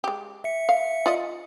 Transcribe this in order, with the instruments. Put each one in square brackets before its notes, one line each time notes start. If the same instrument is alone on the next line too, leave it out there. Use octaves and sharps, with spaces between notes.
[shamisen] G#3 G4
[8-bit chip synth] E5 C#7
[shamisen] F5
F4 D5 D#5